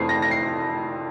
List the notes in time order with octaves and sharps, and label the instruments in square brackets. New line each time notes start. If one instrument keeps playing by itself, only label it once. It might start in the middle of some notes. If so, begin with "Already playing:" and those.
Already playing: [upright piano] F1 F2 E3 A3 C4 C7
A#6
A#6
C7